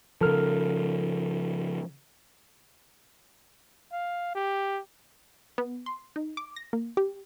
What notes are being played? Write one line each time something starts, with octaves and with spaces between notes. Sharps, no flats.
C#3 F3 A4 A#4 F6
F5
G4
B3
C6
D#4
D6
A#6
A#3
G4